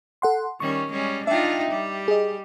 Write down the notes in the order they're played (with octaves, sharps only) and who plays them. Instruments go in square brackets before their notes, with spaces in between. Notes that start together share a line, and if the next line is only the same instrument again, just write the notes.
[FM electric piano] A4 F#5 C6
[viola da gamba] D#3 G3 C#4 [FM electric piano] C#6
[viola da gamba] G3 G#3 C#4
[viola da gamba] D4 D#4 F4 [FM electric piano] E5 G5
[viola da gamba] G3 G4
[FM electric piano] G#4 D#5